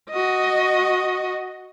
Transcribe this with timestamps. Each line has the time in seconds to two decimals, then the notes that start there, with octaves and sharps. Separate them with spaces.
0.10 F#4 D#5